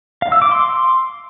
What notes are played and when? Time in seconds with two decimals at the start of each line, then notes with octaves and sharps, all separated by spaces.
0.22 F5
0.32 E6
0.42 D6
0.51 C6